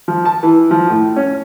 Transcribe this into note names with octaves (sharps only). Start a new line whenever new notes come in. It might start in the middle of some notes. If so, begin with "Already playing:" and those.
F3
A5
E3
F3
A2
C#4